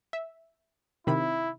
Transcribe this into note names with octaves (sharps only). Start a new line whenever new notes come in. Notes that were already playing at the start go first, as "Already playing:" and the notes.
E5
C3 D#3 E4 B5